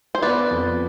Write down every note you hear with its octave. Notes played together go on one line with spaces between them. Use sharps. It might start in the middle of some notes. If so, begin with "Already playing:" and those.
C5
B3 B4 D5
F2